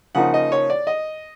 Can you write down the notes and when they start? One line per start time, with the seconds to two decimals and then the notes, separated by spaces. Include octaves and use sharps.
0.15 C#3 F3 A#3 D#4 F#5
0.34 D#5
0.52 C#5
0.70 D5
0.87 D#5